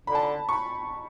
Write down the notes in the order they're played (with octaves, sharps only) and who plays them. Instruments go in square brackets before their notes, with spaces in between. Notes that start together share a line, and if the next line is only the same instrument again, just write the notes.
[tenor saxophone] D3 [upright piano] B5
[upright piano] A5
B5
C#6
B5